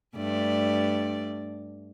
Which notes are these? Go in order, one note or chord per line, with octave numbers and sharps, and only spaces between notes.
G2 A3 D5